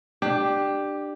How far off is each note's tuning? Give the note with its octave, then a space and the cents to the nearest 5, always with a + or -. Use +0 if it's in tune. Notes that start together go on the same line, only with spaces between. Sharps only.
D4 +20 G4 +0